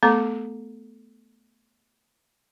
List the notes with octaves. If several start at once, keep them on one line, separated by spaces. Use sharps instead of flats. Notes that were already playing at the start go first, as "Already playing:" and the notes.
A3 B3 A4 A#5 D6